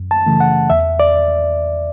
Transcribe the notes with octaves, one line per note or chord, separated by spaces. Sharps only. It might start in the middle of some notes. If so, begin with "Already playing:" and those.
Already playing: F#2
A5
C#3 E3 A3
F#5
E2 E5
D5